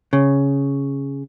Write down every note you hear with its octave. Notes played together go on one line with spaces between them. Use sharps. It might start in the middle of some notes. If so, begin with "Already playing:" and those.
C#3